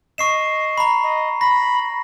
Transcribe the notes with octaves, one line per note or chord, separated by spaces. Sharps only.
D#5 C#6 C7 E7
A#5 B5
D#5
B5 A#6